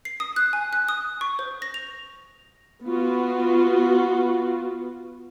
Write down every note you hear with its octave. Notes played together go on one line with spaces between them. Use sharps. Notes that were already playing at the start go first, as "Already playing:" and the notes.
C7
D#6
F#6
G#5
F#6
D#6
C#6
C5
A#6
F7
B3 F4 F#4